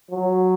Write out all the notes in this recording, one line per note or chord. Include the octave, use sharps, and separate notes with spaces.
F#3